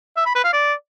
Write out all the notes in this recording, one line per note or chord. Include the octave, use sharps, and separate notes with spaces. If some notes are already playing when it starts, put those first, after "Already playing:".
E5
B5
B4
F5
D5